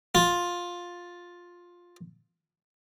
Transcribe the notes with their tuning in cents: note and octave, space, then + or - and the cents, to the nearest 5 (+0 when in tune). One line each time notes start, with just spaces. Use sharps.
F4 +10